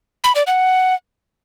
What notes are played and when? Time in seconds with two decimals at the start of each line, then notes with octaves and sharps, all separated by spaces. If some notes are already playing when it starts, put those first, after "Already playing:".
0.24 B5
0.35 D5
0.47 F#5